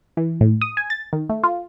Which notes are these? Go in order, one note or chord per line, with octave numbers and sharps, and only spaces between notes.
E3
A2
D#6
G#5
A6
D#3
A3
F4